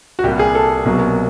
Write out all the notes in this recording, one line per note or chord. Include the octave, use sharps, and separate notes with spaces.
F#4
C2 A#2 G3 G4
G#4
A4
C2 B2 F#3 A#3